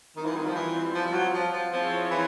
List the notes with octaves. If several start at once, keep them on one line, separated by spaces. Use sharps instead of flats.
D#3 G3 C4 F4
E3
D#3
F3
E3
F3
F3
F#3
F3
F3
F3 C4 E4 G#4 C#5
E3